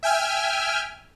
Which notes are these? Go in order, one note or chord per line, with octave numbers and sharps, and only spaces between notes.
E5 G5 G#5 F6